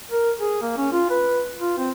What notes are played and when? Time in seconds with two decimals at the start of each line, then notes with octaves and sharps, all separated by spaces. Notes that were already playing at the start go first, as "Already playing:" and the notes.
0.11 A#4
0.40 G#4
0.62 A#3
0.77 C#4
0.92 F4
1.10 B4
1.59 F4
1.78 C4